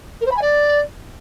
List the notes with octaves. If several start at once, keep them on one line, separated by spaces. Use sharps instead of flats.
A#4
C5
B5
G#5
D5